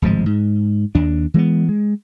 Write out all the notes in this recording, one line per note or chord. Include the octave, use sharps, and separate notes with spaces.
D1 G#1 F3 G#3
G#2
D#2 D4
E3 G#3 A#3 B3
G#3